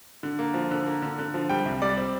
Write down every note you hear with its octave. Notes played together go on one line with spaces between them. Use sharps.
D3
A#3
F3
D3
A#3
D3
D3
F3
G3 G5
C2
G3 D5
C4